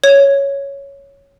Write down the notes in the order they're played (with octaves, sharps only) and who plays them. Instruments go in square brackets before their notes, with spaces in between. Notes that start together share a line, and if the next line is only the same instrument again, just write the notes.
[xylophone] C#5